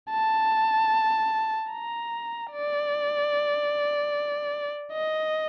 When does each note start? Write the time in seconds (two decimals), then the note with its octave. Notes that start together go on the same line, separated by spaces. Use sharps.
0.10 A5
1.72 A#5
2.52 D5
4.93 D#5